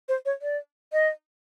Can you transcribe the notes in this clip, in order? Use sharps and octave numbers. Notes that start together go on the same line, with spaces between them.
C5
C#5
D5
D#5